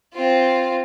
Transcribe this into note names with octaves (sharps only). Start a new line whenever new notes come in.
C4 F4